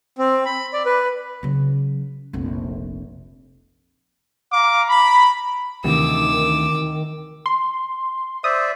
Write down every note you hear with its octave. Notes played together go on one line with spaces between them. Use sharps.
C4
B5
D5
B4
C#3 F#3
F1 A#1
F5 A#5 D6
A#5 B5
D2 C3 D#3 E3 D6 E6
C6
C5 D5 E5 D#6